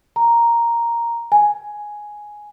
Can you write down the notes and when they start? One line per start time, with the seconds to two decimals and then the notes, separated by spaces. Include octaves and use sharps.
0.16 A#5
1.32 G#5